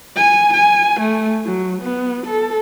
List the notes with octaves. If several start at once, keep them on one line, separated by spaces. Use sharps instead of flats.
G#5
G#5
A3
F#3
B3
A4